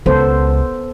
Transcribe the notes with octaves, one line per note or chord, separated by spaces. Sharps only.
C#2 B3 A4 C5